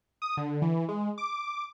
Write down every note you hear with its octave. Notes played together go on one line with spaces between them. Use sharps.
D#6
D3
E3
G#3
D6